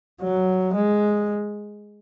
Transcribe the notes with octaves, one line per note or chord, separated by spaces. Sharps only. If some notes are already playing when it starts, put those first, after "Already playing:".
F#3
G#3